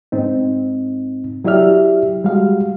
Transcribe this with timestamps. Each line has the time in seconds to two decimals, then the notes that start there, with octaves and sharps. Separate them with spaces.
0.12 G#2 C4 D#4
1.44 F#3 E4 G4 D5 E5 F6
2.24 G3 G#3 F#4 F5